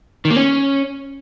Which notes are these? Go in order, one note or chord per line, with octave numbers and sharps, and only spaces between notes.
D#3
A#3
C#4